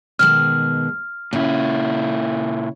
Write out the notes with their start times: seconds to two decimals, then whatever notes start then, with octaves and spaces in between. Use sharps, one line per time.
0.19 B2 D#3 G#3 F6
1.33 A#2 C#3 E4